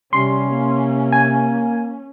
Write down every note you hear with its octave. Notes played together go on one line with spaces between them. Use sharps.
C3 G3 C#4 C6
A#3
G#5